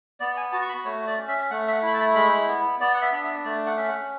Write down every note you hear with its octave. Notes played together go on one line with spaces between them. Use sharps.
B3 D5
G#5
F#4 A5
C#6
B5
A3 C#5
D5
C#4
E5
A3 F#5
E5
F#5
E4 B5
A5
G#3 B5
B3
B3 D5
F#5
E5
D4
E5
A3 D5
F#5
C#4 E5
F#5